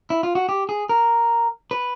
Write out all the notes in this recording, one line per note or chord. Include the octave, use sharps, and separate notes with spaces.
E4
F4
F#4
G4
G#4
A#4
B4